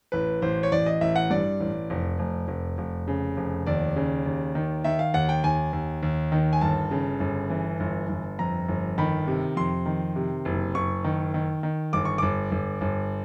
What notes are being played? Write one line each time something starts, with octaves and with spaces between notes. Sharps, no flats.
A1 B4
A1 C5
C#5
A1 D5
D#5
A1 E5
F#5
G2 D5
A1
F1
F1
F1
F1
C#3
F1
D#2 D5
C#3
D#2
D#3
D#3 E5
F5
D#2 F#5
G5
D#2 G#5
D#2
D#2
D#3
G#5
G1 A5
C#3
G1
E3
G1
G1
F2 A#5
G1
D#3 B5
C3
F2 C6
D#3
C3
F#1
F#1 C#6
D#3
D#3
D#3
G1 D6
C#6
G1 D6
G1
G1